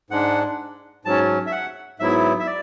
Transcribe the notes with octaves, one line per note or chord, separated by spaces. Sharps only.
G#2 G#3 D4 F#5
G#2 F#3 C#4 A5
E5
F#5
G#2 F#3 B3 E4 E5
E5
D5